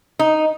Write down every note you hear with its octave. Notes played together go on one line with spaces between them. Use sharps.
D#4